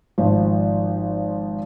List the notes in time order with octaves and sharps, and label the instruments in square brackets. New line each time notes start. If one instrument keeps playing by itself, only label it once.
[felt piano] G#1 F3